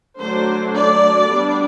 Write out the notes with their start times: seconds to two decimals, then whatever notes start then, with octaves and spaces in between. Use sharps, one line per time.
0.20 D3 F#3 A3 D4 C5
0.74 D5
1.29 G3 B3 D4